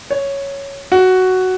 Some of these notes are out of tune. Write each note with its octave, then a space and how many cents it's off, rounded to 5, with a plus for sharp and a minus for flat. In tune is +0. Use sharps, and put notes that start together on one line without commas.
C#5 +0
F#4 +5